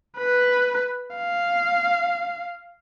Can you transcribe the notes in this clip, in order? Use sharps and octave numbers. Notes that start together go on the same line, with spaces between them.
B4
F5